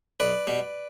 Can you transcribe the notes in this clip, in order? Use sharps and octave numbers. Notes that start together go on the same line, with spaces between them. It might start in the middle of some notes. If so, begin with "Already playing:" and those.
B1 B4 D5
B2 G3